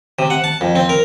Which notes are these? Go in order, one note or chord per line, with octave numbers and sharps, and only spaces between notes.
C3
F#5
A5
F2
C4
A#4